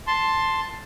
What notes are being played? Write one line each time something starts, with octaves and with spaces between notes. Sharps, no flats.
A5 C6